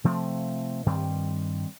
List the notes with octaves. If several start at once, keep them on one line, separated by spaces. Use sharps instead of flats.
C3 F3 A3 C4
G2 D#3 G3 C4